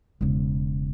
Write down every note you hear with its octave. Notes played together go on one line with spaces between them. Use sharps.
E1 C#3